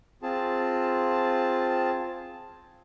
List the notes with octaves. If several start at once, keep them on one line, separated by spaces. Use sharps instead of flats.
C4 F4 G#4 A5